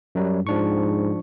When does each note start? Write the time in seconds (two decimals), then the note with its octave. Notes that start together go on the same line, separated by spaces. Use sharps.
0.15 F#2 F#3 G3
0.47 G#2 F3 D4 C#6